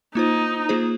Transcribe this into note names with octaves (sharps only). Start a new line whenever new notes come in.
A#3 D#4 F4 C5
A#3 F4 G#4 C5